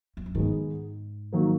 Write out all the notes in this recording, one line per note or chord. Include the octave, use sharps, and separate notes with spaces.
F2
F#2
G#2 D#3 G#3 B3
D#3 F#3 A#3